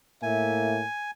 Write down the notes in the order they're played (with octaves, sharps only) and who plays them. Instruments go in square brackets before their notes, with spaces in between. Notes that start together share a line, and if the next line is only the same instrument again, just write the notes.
[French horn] A2 [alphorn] A#3 [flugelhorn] E5 [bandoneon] G#5